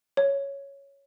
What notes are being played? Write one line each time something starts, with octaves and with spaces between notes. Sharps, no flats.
C#5